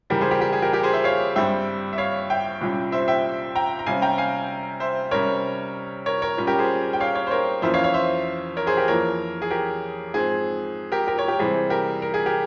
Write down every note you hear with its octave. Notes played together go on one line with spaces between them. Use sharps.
E2 C#3 G3 G4 A#4
G#4 C5
G4 A#4
G4 A#4
G#4
G4 A#4
G4 A#4
G#4 C5
C5 E5
C#5 F5
G2 G3 C4 E5 G5
E5
C#5 F5
E5 G5
C2 A#2 G3 C#4
C5 E5
E5 G5
G5 A#5
A#5
C3 G3 C#4 F5 G#5
G5 A#5
F5 G#5
C5 E5
C3 G3 C#4 A#4 C#5
A#4 C#5
A#4 C#5
A#2 G3 C#4
G4 A#4
G#4 C5
G5
C#5 F5
C#5 F5
C5
A#4 C#5
F2 E3 A#3 C#4 C5 E5
C#5 F5
C#5 F5
C5 E5
A#4 C#5
G#4 C5
G4 A#4
F2 E3 A#3 A#4 C#5
G#4
G4 A#4
G#2 F3 C4 G#4
G4 A#4
G4 A#4
A#4 C#5
G4 A#4
C3 E3 G3 C4 G#4
G4 A#4
A#4
G#4
G4 A#4